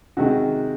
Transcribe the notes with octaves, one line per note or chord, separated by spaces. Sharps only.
C3 D#3 G#3 F#4